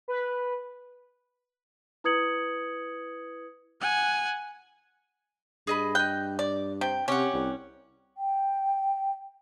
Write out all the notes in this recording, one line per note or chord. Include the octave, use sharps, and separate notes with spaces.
B4
E4 B4 D#6 G#6 C#7 F#7
F#5 G#5
G2 G#4 D#5 B5
D#5 G5 F#6
D5
C3 G5
C3 C#4 G4 F#5
C2
G5